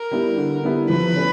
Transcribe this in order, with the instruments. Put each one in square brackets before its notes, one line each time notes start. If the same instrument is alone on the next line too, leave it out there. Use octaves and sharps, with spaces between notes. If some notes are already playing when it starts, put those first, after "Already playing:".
Already playing: [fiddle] A#4
[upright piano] G3 B3 E4
D3
G3 B3 E4
[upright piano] F3 [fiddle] B4
[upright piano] A3 C#4